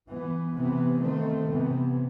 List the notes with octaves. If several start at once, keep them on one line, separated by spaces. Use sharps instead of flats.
E3 B3
C3 E3 B3
D#3 A3 C4
C3 E3 B3